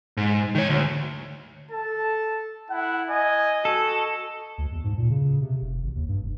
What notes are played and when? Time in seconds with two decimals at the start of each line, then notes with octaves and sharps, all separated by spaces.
0.17 G#2
0.55 D#3 C#5
0.69 D2
1.71 A4 A5
2.71 E4 F#5
3.10 D#5 G#5
3.65 F#4 A4
4.58 D2
4.72 E2
4.84 G#2
4.98 A#2
5.10 C#3
5.42 C3
5.61 F1
5.82 G#1
5.95 D#2
6.08 G2
6.23 F1